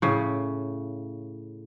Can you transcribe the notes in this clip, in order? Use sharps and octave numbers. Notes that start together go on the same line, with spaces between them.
A2 C#3